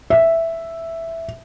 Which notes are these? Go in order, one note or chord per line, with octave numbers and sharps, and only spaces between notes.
E5